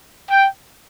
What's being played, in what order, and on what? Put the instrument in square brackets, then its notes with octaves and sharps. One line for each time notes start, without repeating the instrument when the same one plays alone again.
[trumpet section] G5